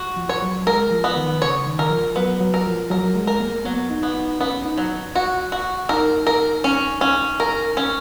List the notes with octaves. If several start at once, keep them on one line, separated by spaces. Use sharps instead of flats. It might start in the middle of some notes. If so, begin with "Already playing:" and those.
Already playing: F#4
F3
C#5
F#3
G#3 A#4
F3
B3
D#3
C#3 C#5
D#3
A#4
F3
F#3 B3
F#3
A#4
F3
F#3 A#4
G#3
A#4
A#3
F#3 B3
D#4
B3
D#4
B3 C#4
D#4
F#3
F#4
F#4
D#4 A#4
A#4
C#4
C#4
A#4
C#4